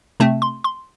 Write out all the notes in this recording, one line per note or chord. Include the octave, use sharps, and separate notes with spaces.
C3 A3 C4 A5
C6
C6